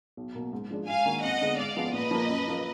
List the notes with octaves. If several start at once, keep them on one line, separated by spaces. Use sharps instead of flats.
B1
B2 A#3
G#2
F3 G#3 D4
G#2 F5 G#5
D#3 A#3 D4 F#4
F2 D#5 F#5
D3 G#3 B3
G#2 D5 F5
F3 B3 F4 G#4
A#2 B4 D#5
F3 A#3
F#2
F3 A#3